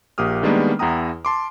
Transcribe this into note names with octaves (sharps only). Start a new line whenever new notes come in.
A#1 A#3 G4 D#6 F6
D#3 G3 G#3 A#3 B3 D4
E2 E4 F#5 G5 A#5 D#6
A5 C6 D6